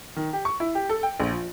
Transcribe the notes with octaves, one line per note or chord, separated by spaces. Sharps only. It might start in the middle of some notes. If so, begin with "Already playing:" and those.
D#3
G4
C#6
E4
G4
A4
G5
A#1
F3